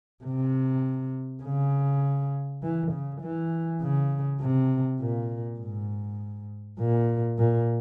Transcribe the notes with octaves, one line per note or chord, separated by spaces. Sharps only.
C3
C#3
E3
C#3
E3
C#3
C3
A#2
G#2
A#2
A#2